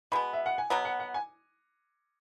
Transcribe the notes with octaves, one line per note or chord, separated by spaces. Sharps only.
B2 G#3 B3 B5
E5
F#5
G#5
B2 F#3 B3 A#5
F#5
F#5
G#5